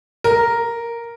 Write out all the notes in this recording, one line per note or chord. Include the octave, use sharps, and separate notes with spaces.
A#4